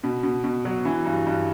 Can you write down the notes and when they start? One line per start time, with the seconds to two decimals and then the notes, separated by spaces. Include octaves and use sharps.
0.04 B2
0.23 B2
0.44 B2
0.65 F#3
0.85 E3
1.06 G2
1.27 G2